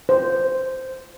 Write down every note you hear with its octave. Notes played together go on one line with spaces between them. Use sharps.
C5